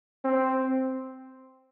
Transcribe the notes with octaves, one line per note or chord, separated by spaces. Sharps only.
C4